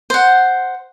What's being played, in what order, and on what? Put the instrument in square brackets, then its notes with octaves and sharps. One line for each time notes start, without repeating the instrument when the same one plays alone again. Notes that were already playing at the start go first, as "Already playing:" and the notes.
[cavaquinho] C5 F#5